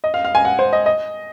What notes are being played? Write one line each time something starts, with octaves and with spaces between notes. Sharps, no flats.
D#5
F5
F5
G#5
F#5
C5
D#5
D#5